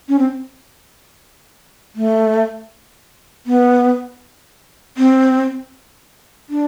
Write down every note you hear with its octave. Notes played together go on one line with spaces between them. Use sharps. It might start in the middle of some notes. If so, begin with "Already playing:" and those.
C#4
C4
A3
B3
C4
D4